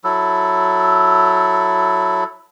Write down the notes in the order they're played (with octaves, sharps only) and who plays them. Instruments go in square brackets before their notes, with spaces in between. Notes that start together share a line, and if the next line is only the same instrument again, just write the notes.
[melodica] F#3 E4 A4